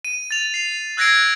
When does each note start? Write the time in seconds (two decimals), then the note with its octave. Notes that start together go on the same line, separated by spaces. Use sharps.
0.05 D#7
0.31 A6 F7
0.54 C7 F7
0.97 E6 F#6 G#6 A#6 C7 D7